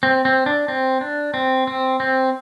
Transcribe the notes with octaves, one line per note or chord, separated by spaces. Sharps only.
C4
C4
D4
C4
D4
C4
C4
C4